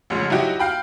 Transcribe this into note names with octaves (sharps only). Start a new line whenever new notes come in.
A1 F2 C#3 G#3
F#3 D#4 E4 F#4 G4
F5 G5 B5